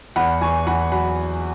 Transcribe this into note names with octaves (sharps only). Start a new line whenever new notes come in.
E2 F#5 B5
E2 G#5 C#6
E2 F#5 B5
F#3 F#5 B5